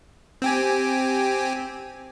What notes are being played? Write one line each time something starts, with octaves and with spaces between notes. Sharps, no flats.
C4 G4 G#5